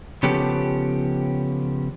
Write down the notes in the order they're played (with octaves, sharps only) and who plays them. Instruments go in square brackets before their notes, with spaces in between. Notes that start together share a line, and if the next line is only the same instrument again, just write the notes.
[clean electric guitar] C#3 F3 B3 C#4 G4 A4